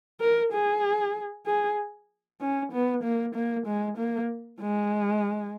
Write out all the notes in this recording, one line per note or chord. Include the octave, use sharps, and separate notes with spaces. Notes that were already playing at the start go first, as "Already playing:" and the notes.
A#4
G#4
G#4
C#4
B3
A#3
A#3
G#3
A#3
G#3